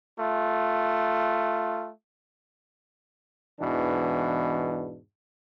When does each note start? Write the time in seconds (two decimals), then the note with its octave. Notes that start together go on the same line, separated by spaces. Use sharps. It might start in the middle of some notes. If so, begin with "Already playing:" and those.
0.20 A3 F4
3.60 E2 G#2 B2 E3 D4